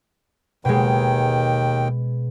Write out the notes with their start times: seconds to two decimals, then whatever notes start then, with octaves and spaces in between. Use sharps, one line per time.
0.65 D#2 B2 D#3 G#3 G5